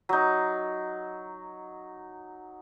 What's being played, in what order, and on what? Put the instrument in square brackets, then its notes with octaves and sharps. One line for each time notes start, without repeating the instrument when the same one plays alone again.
[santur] F#3 D#4